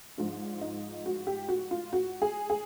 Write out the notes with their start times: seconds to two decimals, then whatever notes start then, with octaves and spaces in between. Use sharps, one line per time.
0.18 G#2 F3 D4
0.61 D#4
1.06 F#4
1.27 G4
1.49 F#4
1.71 F4
1.93 F#4
2.22 G#4
2.50 G#4